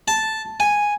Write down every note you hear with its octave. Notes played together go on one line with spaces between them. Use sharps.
A5
G#5